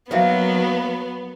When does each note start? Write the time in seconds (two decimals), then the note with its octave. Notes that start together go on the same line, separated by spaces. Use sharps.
0.11 F#3 A#3 B3 D#4 F#4 C5 E5 F5